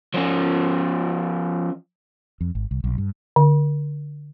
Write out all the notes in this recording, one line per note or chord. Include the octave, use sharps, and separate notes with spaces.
F3 C#4
F2
G#1
C2
B1
G2
D3